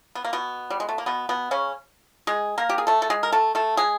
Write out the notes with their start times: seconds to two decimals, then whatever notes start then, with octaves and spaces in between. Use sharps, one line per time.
0.15 B3
0.25 A#3
0.33 B2 B3
0.70 G3
0.80 G#3
0.89 A3
0.98 A#3
1.06 B2 B3
1.29 B2 B3
1.51 C#3 C#4
2.27 G#3 G#4
2.58 A#3 A#4
2.69 G4
2.78 G#4
2.87 A3 A4
3.02 A4
3.10 G#3 G#4
3.23 A#4
3.32 A3 A4
3.55 A3 A4
3.77 G#3 G#4